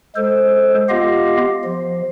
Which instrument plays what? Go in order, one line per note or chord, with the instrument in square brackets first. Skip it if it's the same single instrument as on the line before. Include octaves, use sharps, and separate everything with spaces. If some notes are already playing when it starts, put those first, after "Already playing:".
[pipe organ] G#3 A4 C5
B3 F4 G4 D#5 F5
F3